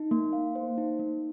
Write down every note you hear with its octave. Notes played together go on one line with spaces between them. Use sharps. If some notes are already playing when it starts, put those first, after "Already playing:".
Already playing: D#4
A#3
F5
C5
D#4
A#3